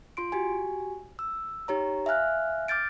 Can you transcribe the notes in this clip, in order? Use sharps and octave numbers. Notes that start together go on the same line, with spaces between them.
F4 C6 D7
F#4 G4 G#5
E6
D#4 G4 C#5 A#5
E5 F5 G#5 F6 F#6
D6 F6 G6 A6 D7